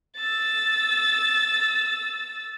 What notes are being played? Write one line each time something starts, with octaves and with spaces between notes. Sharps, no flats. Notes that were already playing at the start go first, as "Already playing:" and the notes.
E6 A6